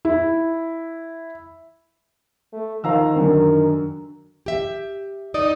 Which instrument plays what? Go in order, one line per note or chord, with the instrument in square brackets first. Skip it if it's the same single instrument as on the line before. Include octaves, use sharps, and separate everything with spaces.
[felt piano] E4
[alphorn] A3
[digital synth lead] D#3 [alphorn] F3 [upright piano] F5 A#5 E6
[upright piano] F#2 D3 [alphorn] A#4
[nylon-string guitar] G4 E5
[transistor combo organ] D#4 [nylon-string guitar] D5